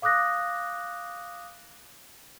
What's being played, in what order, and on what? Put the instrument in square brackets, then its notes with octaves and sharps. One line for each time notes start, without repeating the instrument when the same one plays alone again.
[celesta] F5 D6 D#6 F#6 A#6